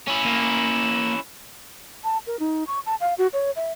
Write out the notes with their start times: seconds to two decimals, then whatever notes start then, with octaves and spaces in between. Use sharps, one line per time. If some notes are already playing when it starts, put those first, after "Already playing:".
0.07 C#4 E4
0.25 A#3
2.04 A5
2.27 A#4
2.39 D#4
2.67 C#6
2.86 A5
3.00 F5
3.18 F#4
3.33 C#5
3.56 E5